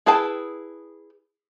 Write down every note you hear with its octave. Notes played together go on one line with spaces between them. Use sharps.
E4 G#4 B4 G5 A5